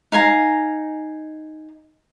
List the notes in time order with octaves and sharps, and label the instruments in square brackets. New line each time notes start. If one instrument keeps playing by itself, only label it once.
[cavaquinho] D#4 F5 G#5 A#5